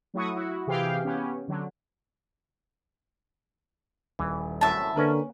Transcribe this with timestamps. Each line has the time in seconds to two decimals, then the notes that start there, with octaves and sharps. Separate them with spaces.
0.14 F#3 A3 E4 F#4 C#6 D#6
0.36 E4 F#4
0.67 C3 E3 G4 G#4 F5 G5
1.04 B3 C#4 G4
1.48 D3 F#3
4.19 D#1 E3
4.61 C2 F#2 A2 E5 A5
4.96 D3 A#3 C#4 A#4 B4